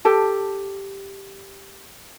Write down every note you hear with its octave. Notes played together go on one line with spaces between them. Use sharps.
G4 A4 A5